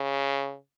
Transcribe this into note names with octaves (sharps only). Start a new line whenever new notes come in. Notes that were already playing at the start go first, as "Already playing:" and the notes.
Already playing: C#3